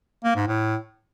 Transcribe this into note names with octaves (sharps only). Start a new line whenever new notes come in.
A#3
G#2
A2